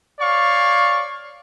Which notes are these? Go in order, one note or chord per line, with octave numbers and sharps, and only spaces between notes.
C#5 D5 F5 C#6